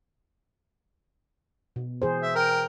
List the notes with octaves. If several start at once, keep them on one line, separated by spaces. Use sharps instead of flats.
B2
E3 G#4 C5
E5
A#4 G5